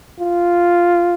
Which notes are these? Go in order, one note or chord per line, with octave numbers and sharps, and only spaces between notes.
F4